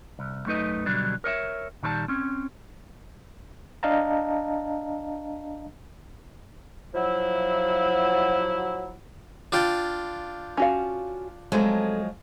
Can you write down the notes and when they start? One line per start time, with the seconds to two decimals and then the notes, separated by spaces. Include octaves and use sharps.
0.19 C2
0.46 F#2 A3 D#4 B4 D#5
0.86 B2 D3 F#3 G3 D4
1.24 A#4 C#5 D#5 E5
1.83 A#2 D#3 G3 B4 A5
2.08 C4 C#4
3.83 D4 D#5 F5 A5 A#5
6.95 F3 F#3 E4
9.52 D4 F4 G5
10.57 C#4 F#4 F5
11.52 F3 F#3 G#3 A3 C4 A4